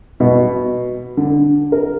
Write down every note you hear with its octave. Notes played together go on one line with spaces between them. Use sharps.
B2
D3
A#4